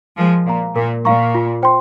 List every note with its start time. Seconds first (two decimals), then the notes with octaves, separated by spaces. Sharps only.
0.18 F3 G#3 A#4
0.46 A#2 F5 A#5
0.76 A#2 A#4
1.05 A#2 F5 A#5 C#6
1.35 F4
1.63 C5 G5 C6